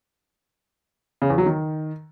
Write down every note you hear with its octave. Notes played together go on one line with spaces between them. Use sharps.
C#3
E2
F#3
D#3